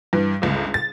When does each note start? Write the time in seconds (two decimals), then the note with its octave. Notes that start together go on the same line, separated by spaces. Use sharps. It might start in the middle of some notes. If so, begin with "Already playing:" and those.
0.13 G2 E3
0.42 G1 C#2
0.74 A6